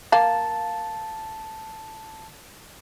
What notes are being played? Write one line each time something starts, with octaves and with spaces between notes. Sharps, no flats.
A#3 F5 A5